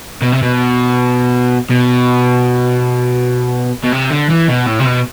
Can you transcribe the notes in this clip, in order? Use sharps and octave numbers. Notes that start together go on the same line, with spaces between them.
B2
C3
B2
B2
B2
C3
D3
E3
B2
A2
C3
B2